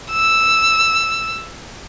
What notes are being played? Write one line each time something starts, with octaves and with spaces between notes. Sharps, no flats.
E6